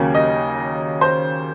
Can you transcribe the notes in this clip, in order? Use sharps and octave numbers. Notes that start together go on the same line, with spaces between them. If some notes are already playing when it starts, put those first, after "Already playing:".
Already playing: D#2 C#3 F#3 A#3 C#4
D#5
C5